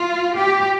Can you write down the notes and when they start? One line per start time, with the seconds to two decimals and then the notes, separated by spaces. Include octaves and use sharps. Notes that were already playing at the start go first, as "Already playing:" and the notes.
Already playing: F4
0.37 G4